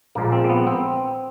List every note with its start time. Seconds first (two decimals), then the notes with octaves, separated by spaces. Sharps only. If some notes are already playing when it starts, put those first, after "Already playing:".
0.15 A#1 A#2 F3 G#3 A#3
0.32 C4
0.44 A#3
0.49 B3
0.67 C4